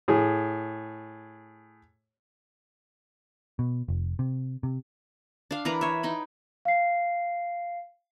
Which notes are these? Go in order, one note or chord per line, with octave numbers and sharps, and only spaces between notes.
A2 G#4
B2
F1
C3
C3
D4 F5
E3 A#4 B4 A#5
C#5 E5
D#4 G5 B5
F5 C7